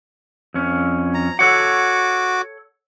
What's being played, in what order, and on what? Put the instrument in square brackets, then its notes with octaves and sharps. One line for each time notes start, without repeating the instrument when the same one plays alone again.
[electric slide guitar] F2 C#4
[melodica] A#5
[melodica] F#4 D6 [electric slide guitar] A4 C#5 F#5